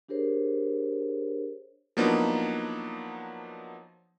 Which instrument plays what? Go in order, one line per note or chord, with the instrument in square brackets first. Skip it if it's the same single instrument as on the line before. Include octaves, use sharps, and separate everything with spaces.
[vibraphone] D4 G4 G#4 A#4 C5 C#5
[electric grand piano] F3 F#3 A#3 B3 D4 D#4